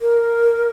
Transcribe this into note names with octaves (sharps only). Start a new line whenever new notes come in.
A#4